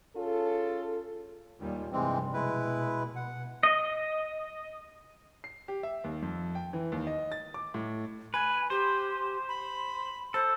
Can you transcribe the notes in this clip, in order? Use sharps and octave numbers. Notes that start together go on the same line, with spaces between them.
C#4 F4 G#4 A4
D#2 A#2 D#3 G3
F1 G2 E3 G3 G#3 C4
B2 G#3 E4 B4
F#5
D#5
C7
G4
E5
D#2
F2
G5
E3
D#2
D#5
A6
D6
A2
B4 G#5
G4 C5
B5
A4 C5